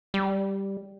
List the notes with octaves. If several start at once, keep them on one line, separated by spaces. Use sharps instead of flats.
G3